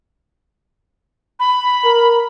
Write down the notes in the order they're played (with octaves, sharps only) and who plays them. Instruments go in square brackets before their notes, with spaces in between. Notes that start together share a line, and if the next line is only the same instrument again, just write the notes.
[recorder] B5
[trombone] A#4